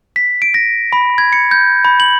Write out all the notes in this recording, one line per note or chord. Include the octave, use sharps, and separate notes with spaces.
B6
D7
A#6
B5
G#6
C#7
G6
B5
F#7